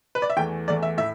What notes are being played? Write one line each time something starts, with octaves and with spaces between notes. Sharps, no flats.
B4
D5
E5
E2 E3 A3 G5
E2 E3 A3 D5
E5
A2 E5